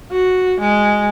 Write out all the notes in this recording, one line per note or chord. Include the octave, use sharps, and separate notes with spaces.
F#4
G#3